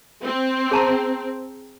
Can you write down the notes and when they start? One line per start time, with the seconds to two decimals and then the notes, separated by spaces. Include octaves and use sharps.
0.23 C4
0.71 G#4 A5 A#5